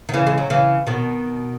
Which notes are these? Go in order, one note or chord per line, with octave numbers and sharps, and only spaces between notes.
D#3
C#3 E3
G#3
F#3
C#3 E3
B2 D#3